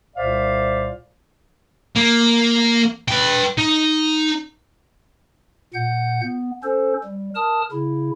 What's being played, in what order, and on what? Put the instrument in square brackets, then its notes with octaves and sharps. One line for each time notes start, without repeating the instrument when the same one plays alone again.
[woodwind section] C2 A#2 C5 D5 E5 F5
[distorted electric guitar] A#3
B4 G5
D#4
[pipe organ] A#2 F#5 G6
B3
C#4 A4 C5
G3
A#4 A5 D#6 F6
C#3 E4